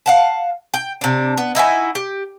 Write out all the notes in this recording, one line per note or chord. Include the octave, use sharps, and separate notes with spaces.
F5 F#5 A5
G5
C3 D4
B3
D#4 E4 F#4 G#5
G4